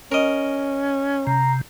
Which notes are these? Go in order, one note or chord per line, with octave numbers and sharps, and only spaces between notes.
C#4 A#4 D#5
C3 A#5